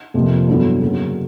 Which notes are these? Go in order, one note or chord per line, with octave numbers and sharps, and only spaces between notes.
F2 C3 F3 A#3
G2 D3 F#3 B3 E4
C#3 F#3 A#3